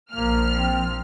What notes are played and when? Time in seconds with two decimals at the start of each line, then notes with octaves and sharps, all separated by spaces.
0.12 A#1 F3 A#3 F6
0.51 C4